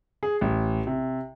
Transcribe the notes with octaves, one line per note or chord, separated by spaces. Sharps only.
G#4
A1
C3